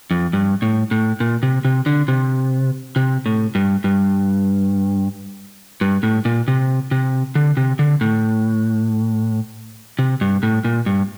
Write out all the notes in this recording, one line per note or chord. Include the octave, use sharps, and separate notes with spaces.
F2
G2
A2
A2
A#2
C3
C3
D3
C3
C3
A2
G2
G2
G2
A2
A#2
C3
C3
D3
C3
D3
A2
C3
G2
A2
A#2
G2